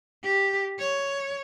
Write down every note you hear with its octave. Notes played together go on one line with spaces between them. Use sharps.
G4
C#5